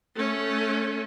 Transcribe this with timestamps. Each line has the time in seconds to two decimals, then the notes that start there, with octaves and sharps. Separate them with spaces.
0.15 A3 C#4